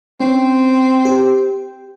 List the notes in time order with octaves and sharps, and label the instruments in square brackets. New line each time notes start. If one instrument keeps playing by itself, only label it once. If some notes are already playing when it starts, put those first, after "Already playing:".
[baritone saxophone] C4 [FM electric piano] C#4
[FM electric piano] G4